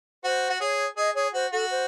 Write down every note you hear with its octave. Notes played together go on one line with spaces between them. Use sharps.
F#4 C5
F#4
G#4 C#5
G#4 D#5
G#4 C#5
F#4 C5
F#4 A4
C5